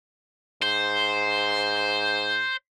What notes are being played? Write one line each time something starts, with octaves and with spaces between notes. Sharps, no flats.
G#2 C5